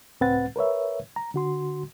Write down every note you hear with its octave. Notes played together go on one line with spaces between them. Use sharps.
C#2 A2 C4 B4 F#5 A6
A#4 B4 C#5 E5
A#5
D3 F#4 C6